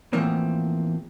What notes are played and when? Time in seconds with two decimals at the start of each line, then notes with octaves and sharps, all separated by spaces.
0.13 E2 A2 E3 F3 A#3 C4